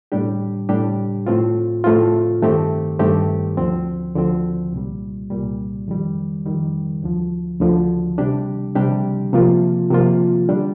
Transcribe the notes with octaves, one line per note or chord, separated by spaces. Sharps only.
A2 G3 D4 G4
A2 G3 D4 G4
A2 A3 C4 F4
A2 A3 C4 F4
G2 D#3 A3 C4 G4
G2 D#3 A3 C4 G4
D2 D3 F3 C4
D2 D3 F3 C4
C2 A#2 G3
C2 A#2 G3
F2 D#3 G3
F2 D#3 G3
D2 D3 F3
D2 D3 F3
C3 G3 D4 G4
C3 G3 D4 G4
C3 F3 A#3 F4
C3 F3 A#3 F4
D3 G3 D4